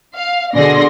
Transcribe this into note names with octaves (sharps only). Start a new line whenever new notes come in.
F5
B2 D3 G#4 D5 C6 A#6